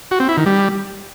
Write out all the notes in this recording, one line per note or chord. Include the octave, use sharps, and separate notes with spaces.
F#4
C4
E4
D#3
G3